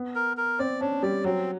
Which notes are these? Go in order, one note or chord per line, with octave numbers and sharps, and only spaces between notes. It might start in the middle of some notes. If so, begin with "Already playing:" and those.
Already playing: B3
A#4
A#4
C4 D5
C#4 D4
G3 D5
F#3 C4